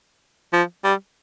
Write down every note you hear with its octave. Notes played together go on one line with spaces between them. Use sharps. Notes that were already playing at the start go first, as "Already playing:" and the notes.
F3
G3